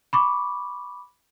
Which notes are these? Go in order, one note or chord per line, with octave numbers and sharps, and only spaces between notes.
B5 C#6 D6